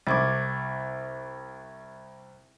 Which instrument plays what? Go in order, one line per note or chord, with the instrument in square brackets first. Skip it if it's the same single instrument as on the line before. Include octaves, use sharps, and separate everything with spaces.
[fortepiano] C2 D6 [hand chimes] C#6 G#6 A6